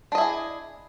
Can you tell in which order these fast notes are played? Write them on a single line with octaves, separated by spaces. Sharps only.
D4 D#5 E4 G#4